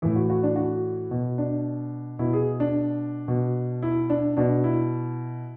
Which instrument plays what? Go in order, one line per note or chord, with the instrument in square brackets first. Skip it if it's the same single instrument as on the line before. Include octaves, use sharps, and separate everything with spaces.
[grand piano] A2 E3 E4
F#4
F#4
D4
F#4
B2
D4
B2 E4
G#4
D4
B2
E4
D4
B2 D4
E4